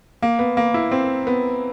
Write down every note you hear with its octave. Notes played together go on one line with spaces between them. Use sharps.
A#3
B3
A#3
E4
C4
B3